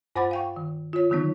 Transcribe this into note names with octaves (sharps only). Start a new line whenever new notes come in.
G2 C5 F#5 B5 D6 A6
F5 G5 C#6
D#3
F4 C#5
D3 D#3 F#3 B3 D#4